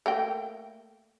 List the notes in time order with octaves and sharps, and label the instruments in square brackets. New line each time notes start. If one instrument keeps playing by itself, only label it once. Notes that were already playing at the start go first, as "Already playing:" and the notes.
[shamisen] A3 A#3 G5